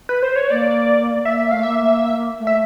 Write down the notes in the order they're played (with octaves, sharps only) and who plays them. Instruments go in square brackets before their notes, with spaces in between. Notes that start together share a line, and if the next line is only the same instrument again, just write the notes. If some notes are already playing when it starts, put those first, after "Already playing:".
[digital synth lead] B4
C5
C#5
[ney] A#3 [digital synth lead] D5
[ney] A#3 [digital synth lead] E5
[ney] A3 [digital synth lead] F5
[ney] A#3 [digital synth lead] E5
[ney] A3
[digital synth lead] E5